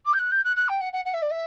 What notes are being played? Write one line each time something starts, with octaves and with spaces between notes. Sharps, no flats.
D6
G6
F#6
G6
F#6
F#6
G5
F#5
F#5
F#5
E5
D5
E5